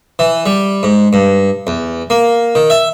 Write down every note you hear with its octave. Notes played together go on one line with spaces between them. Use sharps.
E3
G3
G#2
G2
E2
A#3
D#3
E5